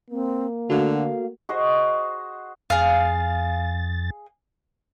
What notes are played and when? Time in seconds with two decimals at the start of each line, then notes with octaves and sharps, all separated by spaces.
0.11 A#3 C4
0.70 D3 A3 F#4 F5
1.49 F#4 G#4 C5 D#5
2.70 F2 G#4 F5 A6